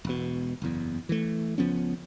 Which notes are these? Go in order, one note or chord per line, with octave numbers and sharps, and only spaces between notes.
E1 B2
F#1 E2
E3 A3
C#2 F3 B3 C#4